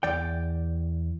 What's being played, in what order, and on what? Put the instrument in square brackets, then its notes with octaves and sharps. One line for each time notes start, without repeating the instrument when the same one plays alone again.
[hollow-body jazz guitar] E2 D5 G5